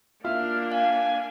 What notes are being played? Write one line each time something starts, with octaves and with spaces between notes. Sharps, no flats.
A#3 D4 E4 F4 E5 F6
F5 G#5